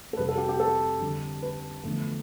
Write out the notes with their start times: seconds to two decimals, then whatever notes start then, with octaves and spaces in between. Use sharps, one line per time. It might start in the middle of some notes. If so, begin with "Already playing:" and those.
0.13 A4
0.17 F2 C3 G3 B4
0.29 A4
0.38 G4
0.49 G4
0.60 A4
1.00 F2 D3 G3
1.42 B4
1.83 E2 D3 F3 A3